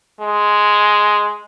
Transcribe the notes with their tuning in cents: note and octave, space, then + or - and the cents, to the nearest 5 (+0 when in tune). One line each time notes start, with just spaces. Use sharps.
G#3 +5